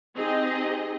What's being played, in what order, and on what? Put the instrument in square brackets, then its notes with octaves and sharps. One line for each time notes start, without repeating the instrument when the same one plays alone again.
[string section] C4 D#4 G4 G#4 D#5